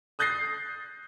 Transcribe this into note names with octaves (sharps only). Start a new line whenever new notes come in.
D#6 F#6 G6 A6 A#6 C7